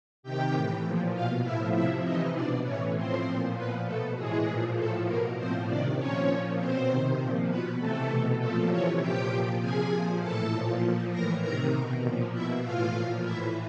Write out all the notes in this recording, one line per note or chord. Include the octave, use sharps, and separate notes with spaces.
C3 D#3 G4 G5
A2 E3
A#2 F3
B2 F4 F5
A2 F3 E4 E5
C3 F3 E4 E5
C3 E3 D#4 D#5
B2 D4 D5
A2 E3 C#4 C#5
A2 F3 C4 C5
A#2 F3
A#2 F3 B3 B4
B2 A3 A4
A2 E3 G#3 G#4
A#2 F3
A2 F3 A3 A4
B2 A#3 A#4
A2 F3 C4 C5
C3 D#3 D4 D5
A#2 F3 C#4 C#5
A#2 F3
B2 C4 C5
C3 D#3
A#2 F3
B2 B3 B4
C3 E3 A3 A4
B2
A#2 F3 A3 A4
C3 E3 C#4 C#5
A#2 F3 G4 G5
A#2 F3
C3 F3 G#4 G#5
A#2 F3
A2 E3 A4 A5
A#2 F3
A#2 F3
A2 E3 A#4 A#5
C3 D#3 A#4 A#5
B2
A#2 F3
B2 E4 E5
A2 E3 F4 F5
A#2 F3
A2 E3 E4 E5